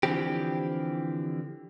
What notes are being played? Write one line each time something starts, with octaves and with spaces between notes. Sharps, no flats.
D3 E3 F3 C4 G4